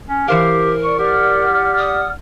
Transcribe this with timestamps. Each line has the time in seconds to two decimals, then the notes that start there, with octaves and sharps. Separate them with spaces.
0.08 C#4
0.28 E3 G4 A#4 C5 F5
0.84 D5 C#6
0.99 G4 D5 F#5 F6
1.78 D#6